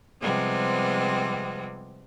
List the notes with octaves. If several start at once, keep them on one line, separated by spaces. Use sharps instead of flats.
C3 F3 G3 G#3 B3 C4